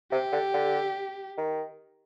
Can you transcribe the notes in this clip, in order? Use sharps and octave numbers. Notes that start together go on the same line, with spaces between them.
C3 G4
D3
D3
D#3